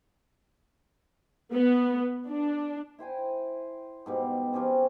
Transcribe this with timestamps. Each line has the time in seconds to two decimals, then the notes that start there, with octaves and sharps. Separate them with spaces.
1.54 B3
2.28 D4
2.99 E4 C5 G5 G#5
4.06 G#2 B2 G3
4.53 F3 G3 C4 C#4